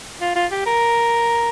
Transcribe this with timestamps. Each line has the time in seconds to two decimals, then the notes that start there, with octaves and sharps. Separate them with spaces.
0.21 F4
0.36 F4
0.52 G4
0.66 A#4